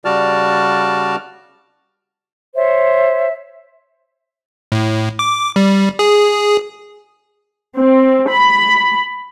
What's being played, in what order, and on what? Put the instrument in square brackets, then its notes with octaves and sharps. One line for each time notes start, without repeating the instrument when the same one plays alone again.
[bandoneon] C#3 G3 F#4 D5 A5 F6
[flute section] C5 C#5 E5
[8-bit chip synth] A2
D6
G3
G#4
[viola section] C4
B5